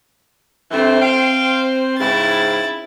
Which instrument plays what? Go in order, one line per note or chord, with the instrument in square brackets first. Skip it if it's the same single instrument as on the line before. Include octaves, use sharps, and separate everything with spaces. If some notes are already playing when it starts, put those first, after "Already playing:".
[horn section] G2 E3 A3 [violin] C4 C5
[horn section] F5 G5
[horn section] G#2 C#3 C4 [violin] E4 A6